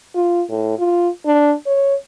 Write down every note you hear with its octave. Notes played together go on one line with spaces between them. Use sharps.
F4
A2
F4
D4
C#5